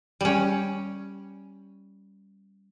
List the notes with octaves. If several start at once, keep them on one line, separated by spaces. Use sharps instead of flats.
G3 C#4